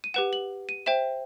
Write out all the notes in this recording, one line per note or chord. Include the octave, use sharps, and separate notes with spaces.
D#7
G4 B4 F#5 E7
F#7
D#7
C5 E5 G5 E7